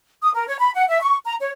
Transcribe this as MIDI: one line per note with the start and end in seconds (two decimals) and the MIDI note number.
0.22 0.32 87
0.34 0.46 70
0.47 0.56 73
0.60 0.72 83
0.75 0.88 78
0.88 0.99 76
1.01 1.16 85
1.26 1.35 82
1.40 1.51 73